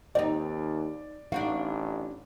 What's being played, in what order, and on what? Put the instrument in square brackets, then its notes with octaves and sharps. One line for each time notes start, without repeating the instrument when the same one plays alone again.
[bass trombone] D#2 [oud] C4 D#4 [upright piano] D5
[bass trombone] A1 [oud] D4 D#4 F#4 [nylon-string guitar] F5